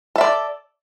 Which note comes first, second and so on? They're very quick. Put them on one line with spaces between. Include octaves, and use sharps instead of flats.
A4 E5 D5